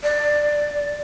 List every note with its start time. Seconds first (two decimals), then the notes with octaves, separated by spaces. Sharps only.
0.03 D5